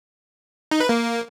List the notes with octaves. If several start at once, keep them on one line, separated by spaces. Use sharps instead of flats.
D#4
B4
A#3